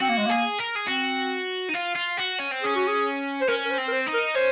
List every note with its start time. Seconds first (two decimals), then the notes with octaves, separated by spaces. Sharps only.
0.01 C4 F#4
0.09 A#3
0.18 G#3
0.26 A#3 G#4
0.59 A#4
0.76 G#4
0.87 C4 F#4
1.69 D#4
1.74 F4
1.96 F4
2.18 F#4
2.39 C#4
2.52 C4
2.62 C#4 G#4
2.75 F#4
2.88 G#4
3.41 C5
3.49 C#4 A#4
3.65 A#4
3.71 C5
3.78 C4
3.88 A#4
3.93 C5
4.07 D#4
4.14 A#4
4.35 C#4 C5